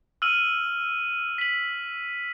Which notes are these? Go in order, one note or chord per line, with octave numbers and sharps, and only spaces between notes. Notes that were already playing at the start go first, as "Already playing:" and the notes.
E6 F6 D#7 F#7
B6 F#7